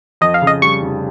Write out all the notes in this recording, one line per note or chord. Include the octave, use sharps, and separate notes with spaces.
F2 D#5
F5
C#3
D#5
G3 C#6
F1